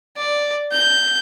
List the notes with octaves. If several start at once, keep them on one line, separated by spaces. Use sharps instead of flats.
D5
G6